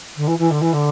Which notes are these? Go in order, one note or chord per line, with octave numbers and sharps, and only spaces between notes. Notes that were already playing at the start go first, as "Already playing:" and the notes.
D3
E3
E3
D3
E3
D3